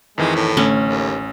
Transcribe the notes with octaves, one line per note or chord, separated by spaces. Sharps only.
F2 D#3 E3 G#3
A2
A1 D3 A3 C#4
D#2